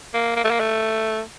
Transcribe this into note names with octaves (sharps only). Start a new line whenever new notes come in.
A#3
A#3
A3
A#3
A3